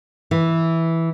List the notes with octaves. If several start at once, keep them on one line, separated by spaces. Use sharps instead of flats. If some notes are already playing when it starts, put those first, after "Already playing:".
E3